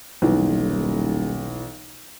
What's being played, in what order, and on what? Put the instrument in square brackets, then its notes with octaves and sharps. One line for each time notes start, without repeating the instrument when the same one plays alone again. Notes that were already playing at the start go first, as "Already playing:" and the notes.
[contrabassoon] D#1 [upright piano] B1 E3